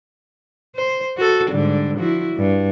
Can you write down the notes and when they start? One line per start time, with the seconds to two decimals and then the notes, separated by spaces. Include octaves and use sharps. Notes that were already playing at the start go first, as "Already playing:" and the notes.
0.75 C5
1.17 F#4 A4
1.51 G#2 D3 G3
1.98 F3 E4 F#4
2.35 G2